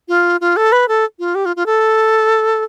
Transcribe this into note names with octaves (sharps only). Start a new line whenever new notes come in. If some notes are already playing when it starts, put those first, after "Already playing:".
F4
F4
A4
B4
A4
F4
G4
F4
F4
A4